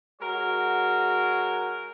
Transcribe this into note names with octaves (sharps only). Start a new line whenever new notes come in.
G#3 F#4 A#4 C#5